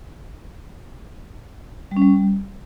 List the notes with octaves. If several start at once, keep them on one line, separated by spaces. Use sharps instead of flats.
G3
C#4
G3